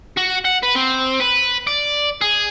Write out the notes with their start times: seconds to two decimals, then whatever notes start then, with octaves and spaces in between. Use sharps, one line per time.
0.17 F#4
0.45 F#5
0.63 B4
0.75 C4
1.20 B4
1.67 D5
2.21 G#4